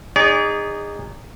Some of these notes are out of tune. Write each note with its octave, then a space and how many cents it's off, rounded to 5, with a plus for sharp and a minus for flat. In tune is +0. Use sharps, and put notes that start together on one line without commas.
D#4 -10 G#4 -25 D5 -45